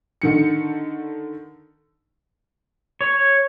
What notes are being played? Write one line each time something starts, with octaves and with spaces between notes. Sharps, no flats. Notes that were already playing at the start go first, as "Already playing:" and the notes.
D3 D#3 C#7
C#5